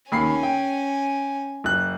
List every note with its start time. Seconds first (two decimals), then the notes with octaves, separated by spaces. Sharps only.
0.12 D#2 C#4 G#5 B5 C7
0.43 G5
1.64 F#1 F#6